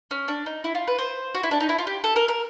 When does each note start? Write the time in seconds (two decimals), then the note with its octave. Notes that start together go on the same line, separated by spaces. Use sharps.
0.11 C#4
0.28 D4
0.46 D#4
0.64 E4
0.75 F4
0.87 B4
0.98 C5
1.35 F#4
1.43 E4
1.51 D4
1.60 D#4
1.69 E4
1.79 F4
1.87 G4
2.04 A4
2.16 A#4
2.28 A#4